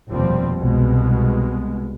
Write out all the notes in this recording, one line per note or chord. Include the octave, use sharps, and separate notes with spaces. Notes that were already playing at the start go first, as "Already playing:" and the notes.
F1 D#2 B2 F3 G3 C4
C2 B2 G#3